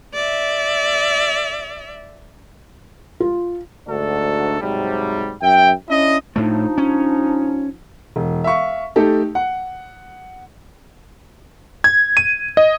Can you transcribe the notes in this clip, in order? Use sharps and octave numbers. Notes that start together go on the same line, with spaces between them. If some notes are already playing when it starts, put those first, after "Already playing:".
D5 E5
F4
D2 G#2 D4 F#4 A4
G#2 C3 F#3 G3
F#2 E5 G5
C#4 D4 E4 D#5
A2 F3 A3 D4 D#4
C#4
E1
E5 F5 C#6
A3 D#4 G4 A4
F#5
G#6
D#7
D#5